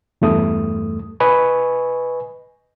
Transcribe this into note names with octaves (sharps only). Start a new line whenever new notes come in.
E2 G2 A3 D#6
B4 D#5 G#5 C#6